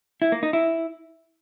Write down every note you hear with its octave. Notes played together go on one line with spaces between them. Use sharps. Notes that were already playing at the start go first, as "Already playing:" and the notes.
E4
A#3
D#4
E4